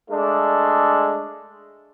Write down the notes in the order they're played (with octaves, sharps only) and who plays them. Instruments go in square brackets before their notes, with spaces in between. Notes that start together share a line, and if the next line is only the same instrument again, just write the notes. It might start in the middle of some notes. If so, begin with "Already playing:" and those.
[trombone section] G#3 A3 D4